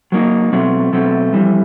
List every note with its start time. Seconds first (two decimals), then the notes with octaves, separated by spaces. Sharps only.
0.12 F#3 A#3 D#4
0.52 B2 F#3 A3 C4
0.92 B2 F#3 A3 C4
1.33 F2 C3 E3 G3